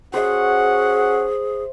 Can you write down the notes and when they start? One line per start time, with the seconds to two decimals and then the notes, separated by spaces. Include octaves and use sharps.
0.14 C#4 F#4 G#4 C5 E5 F#5